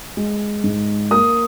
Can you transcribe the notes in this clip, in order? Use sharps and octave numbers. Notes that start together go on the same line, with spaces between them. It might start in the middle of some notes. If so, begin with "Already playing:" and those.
G#3
G#2
A#3 D#6